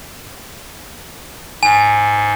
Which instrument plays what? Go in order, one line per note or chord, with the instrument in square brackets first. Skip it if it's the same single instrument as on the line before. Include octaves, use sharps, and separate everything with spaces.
[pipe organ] G#2 [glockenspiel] G#5